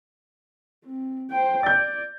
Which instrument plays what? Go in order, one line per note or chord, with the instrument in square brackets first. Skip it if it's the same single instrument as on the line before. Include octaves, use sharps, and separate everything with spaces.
[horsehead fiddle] C4
C5 G5
[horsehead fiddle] D5 [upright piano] G6 A6